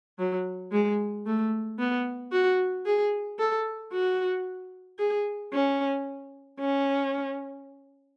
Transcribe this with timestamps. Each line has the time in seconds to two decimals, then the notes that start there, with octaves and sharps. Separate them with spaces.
0.19 F#3
0.72 G#3
1.26 A3
1.79 B3
2.32 F#4
2.86 G#4
3.39 A4
3.92 F#4
4.99 G#4
5.53 C#4
6.59 C#4